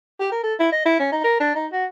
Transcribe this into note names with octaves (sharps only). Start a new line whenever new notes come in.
G4
A#4
A4
E4
D#5
E4
C#4
D#4
A#4
D4
D#4
F#4